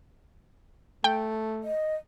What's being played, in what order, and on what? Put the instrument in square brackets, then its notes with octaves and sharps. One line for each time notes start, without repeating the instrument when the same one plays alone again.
[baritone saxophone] A3 [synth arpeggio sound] G5
[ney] D#5